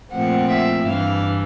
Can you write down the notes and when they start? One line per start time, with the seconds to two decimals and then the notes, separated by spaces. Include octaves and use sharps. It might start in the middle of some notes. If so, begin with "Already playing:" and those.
0.12 A#2 F3 A3 C4 F#5
0.50 E5
0.86 G2 E3 G3 F5